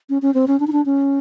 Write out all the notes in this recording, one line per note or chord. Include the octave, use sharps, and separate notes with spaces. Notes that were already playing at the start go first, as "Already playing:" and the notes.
C#4
C#4
C4
C#4
D4
D#4
D4
C#4